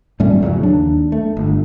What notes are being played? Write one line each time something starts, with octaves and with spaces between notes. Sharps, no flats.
G#2 G3 A3 C#4
E2 C#3 F#3
D#2 D4
A3
G1